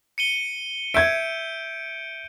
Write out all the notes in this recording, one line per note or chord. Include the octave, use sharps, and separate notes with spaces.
C#7 D#7 G7
E5 G6 G#6 D7